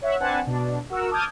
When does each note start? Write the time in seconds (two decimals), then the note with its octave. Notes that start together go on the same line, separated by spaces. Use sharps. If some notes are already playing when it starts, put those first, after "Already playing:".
0.02 C#5 E5 F#5
0.20 C4 D4 B4 F#5 G#5 A5
0.47 B2 D4
0.90 F#4 A#4 E6
1.11 A5 D6 D#6 F6 G6 G#6